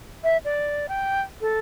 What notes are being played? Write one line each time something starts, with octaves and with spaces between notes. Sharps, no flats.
E5
D5
G5
A4